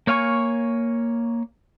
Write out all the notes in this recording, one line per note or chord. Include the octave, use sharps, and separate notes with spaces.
A#3 C#5 F5 G#5 C#6